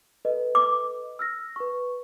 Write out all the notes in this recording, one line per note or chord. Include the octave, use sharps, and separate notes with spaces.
A4 B4 D#5
D6
E6 F6 A#6
B4 C#6